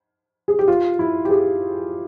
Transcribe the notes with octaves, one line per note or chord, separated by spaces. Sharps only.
G#4
G4
F4
E4
G4
G#4